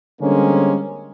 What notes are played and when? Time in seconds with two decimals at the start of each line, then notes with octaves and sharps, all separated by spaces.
0.21 D3 G3 G#3 A#3 C4 C#4